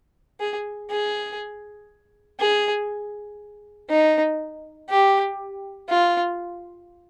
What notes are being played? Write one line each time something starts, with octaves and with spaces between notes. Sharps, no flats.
G#4
G#4
G#4
D#4
G4
F4